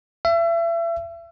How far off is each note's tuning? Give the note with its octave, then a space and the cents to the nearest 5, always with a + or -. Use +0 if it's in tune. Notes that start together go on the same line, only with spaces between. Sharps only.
E5 +35